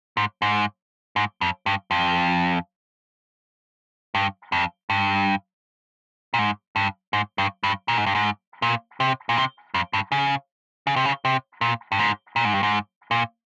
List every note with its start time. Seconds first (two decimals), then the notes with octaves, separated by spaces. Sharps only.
0.17 G#2
0.42 G#2
1.16 G#2
1.41 F2
1.66 G2
1.91 F2
4.15 G2
4.52 F2
4.90 G2
6.34 A#2
6.39 G#2
6.76 G2
7.13 G#2
7.38 G2
7.64 G2
7.88 A#2
7.98 G#2
8.06 G2
8.15 G#2
8.62 A#2
9.00 C3
9.29 A#2
9.37 C3
9.74 F2
9.93 G2
10.12 C#3
10.87 C#3
10.96 C3
11.05 C#3
11.25 C3
11.61 A#2
11.92 G2
11.99 G#2
12.36 A#2
12.45 G#2
12.53 G2
12.63 G#2
13.11 A#2